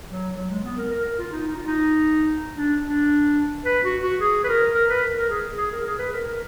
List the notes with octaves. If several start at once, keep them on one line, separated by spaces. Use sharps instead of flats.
F#3
F#3
G#3
B3
A#4
A#4
A#4
F4
D#4
D#4
F4
D#4
D4
D4
B4
F#4
F#4
G#4
B4
A#4
A#4
B4
A#4
A#4
G#4
G#4
A#4
G#4
B4
A#4
A#4